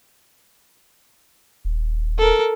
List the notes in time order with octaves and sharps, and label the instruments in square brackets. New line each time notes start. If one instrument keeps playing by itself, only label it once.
[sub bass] D#1
[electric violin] A4 A#4